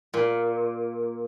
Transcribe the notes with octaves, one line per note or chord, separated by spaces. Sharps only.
A#2